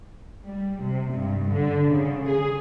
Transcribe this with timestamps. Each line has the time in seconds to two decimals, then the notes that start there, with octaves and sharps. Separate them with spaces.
0.45 G3
0.83 C3
1.14 G2
1.51 D3
1.93 C#3
2.27 G#4